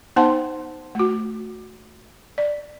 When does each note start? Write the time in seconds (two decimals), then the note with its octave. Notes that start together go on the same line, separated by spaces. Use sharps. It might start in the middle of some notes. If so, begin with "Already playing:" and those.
0.16 B3 D#4 C5 F#5 A5 C6
0.95 A3 F#4
2.38 D5